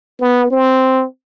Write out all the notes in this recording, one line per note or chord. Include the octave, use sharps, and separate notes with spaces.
B3
C4